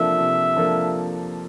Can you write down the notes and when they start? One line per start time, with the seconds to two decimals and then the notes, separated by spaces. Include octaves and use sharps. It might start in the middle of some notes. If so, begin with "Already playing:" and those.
Already playing: C3 F3 A#3 D4 A4 E5
0.19 C3
0.57 F3 A#3 D4 A4